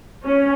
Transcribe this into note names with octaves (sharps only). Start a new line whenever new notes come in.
C#4